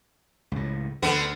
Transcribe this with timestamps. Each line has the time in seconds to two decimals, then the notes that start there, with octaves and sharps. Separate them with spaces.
0.52 C#2 A2
1.02 D2 D3 B3